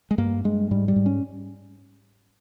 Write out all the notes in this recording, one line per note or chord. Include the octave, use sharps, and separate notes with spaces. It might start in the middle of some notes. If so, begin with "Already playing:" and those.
G#3
G2 A#3
G2 G#3
G#2 G3
G3
G#2
C#4